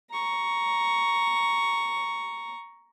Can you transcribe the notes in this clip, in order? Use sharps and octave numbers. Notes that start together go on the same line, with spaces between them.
A#5 C#6